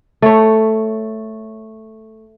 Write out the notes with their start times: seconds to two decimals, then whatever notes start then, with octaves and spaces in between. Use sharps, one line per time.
0.22 A3 C#5